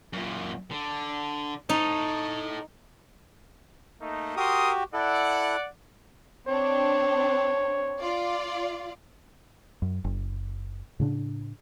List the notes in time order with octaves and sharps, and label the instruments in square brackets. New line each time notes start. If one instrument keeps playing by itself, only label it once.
[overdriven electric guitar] F#2 A#2
D3
[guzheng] D#4 [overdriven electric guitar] A4 C#5
[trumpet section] A3 A#3 D#4
[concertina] F#4 G4 [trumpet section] A#4 C6 D#6
[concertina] E4 A4 [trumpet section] D5 F#5
[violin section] C4 D4 [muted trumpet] C#5
[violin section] F4 D5 F5
[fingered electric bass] F#2
F#1
A2 C#3 D4